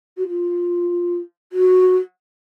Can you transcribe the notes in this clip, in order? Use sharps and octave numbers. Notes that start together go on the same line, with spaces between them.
F#4
F4
F#4